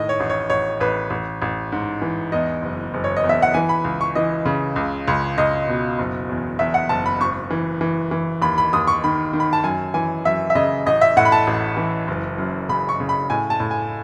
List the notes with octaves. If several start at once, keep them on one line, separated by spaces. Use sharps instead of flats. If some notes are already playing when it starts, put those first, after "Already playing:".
Already playing: A2 D#3 D#5
C#5
A1
C#5
A1 C#5
A1 B4
A1
A1
G#2
E3
E2 D#5
F#1
F#1
C#5
D#5
E2
E5
F#5
E3 G#5
B5
C#2
C#6
E3 D#5
C#3
C#2
C#2
C#2 D#5
B2
F#1
E2
E2 E5
F#5
F#1 A5
B5
G#1 C#6
E3
E3
E3
D#2 B5
B5
D#2 D#6
C#6
D#3 B5
D#3
B5
A5
F#2 G#5
E3 G#5
F#2 E5
E5
C#3 D#5
A1 D#5
E5
A2 F#5
B5
A5
A1
E3
F#1
F#2
C#3 B5
C#6
C#3
B5
A2 G#5
A5
A2
G#5